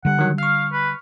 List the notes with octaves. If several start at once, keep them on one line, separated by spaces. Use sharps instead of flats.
D3 G3 F#5
D#3 F#3
F5 C#6 F6
B4